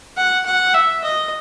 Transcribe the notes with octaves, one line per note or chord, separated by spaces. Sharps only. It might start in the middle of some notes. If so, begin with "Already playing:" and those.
F#5
F#5
E5
D#5